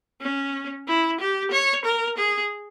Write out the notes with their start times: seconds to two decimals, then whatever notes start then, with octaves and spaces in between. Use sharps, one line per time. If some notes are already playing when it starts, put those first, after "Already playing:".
0.21 C#4
0.88 E4
1.20 G4
1.51 C#5
1.85 A#4
2.18 G#4